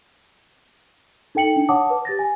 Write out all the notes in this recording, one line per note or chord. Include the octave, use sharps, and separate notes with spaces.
D#4 A4 G5 C#7 F#7
D4
C#5 F#5 A5 D6 D#6
B4
G4 A6 A#6
G#5